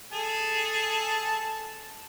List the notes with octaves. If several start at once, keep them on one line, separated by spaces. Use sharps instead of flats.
G#4 A4 A5